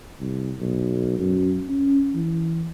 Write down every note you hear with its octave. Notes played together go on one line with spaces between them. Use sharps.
C2
B1
F#2
C#4
E3